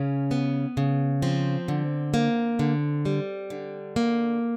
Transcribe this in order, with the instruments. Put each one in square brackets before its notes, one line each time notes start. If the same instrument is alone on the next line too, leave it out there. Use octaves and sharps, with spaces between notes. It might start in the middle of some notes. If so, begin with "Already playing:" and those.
Already playing: [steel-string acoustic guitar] C#3 C#4
B3
C#3
F3 C4
D3
A#3
D3
G3
D3
A#3